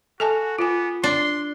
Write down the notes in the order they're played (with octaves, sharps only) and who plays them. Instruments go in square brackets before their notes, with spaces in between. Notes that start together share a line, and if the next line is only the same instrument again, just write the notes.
[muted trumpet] F#4 [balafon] A4 G#5 A5
[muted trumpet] B3 [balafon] F4 G#5
[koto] D4 [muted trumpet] C6